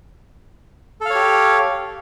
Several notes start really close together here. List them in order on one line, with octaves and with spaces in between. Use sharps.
A4 F5 C#5 G4